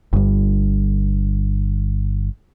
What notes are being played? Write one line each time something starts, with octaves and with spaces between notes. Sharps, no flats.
G1 G2